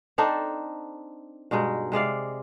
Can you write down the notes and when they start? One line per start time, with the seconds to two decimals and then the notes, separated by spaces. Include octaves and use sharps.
0.18 C4 D4 D#4 A4
1.51 G2 B2 G#3 D#4
1.92 C3 G#3 D5 F5